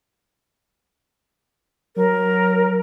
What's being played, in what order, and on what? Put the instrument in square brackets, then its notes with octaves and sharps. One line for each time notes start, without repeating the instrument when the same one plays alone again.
[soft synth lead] F#3 [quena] A#4